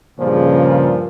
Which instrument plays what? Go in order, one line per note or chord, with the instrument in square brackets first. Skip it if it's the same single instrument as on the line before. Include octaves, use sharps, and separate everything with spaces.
[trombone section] G2 A#2 F3 [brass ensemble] C#3